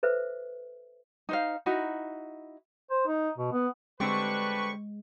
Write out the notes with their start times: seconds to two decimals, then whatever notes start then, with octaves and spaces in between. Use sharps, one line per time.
0.03 A4 B4 C5 E5
1.29 D#4 C5 F5
1.66 D#4 E4 F#4
2.90 C5
3.07 D#4
3.38 B2
3.53 B3
4.00 D3 G3 G#3 C4 D4 G4 B4 C#6